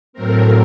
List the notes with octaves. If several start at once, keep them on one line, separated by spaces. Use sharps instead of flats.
A2 F#3 A3 C4 A#4